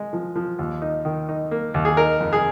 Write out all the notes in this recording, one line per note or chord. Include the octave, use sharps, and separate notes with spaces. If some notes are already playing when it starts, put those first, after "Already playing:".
Already playing: G#3
F3
F3
D#2
D#4
D#3
D#4
A#3
D#2
G#4
D#4 A#4
F2
G#4